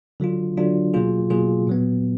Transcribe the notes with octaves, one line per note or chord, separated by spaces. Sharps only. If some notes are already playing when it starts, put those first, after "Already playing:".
D3 F#3 D4 F4
D3 F#3 D4 F4
B2 F#3 A#3 F4 G#4
B2 F#3 A#3 F4 G#4
A#2 F#3 B3